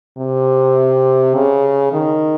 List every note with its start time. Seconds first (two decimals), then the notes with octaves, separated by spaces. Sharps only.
0.18 C3
1.34 C#3
1.93 D#3